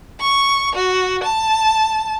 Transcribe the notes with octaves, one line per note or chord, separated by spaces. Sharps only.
C#6
F#4
A5